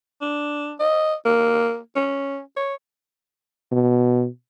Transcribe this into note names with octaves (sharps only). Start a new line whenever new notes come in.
D4
D#5
A#3
C#4
C#5
B2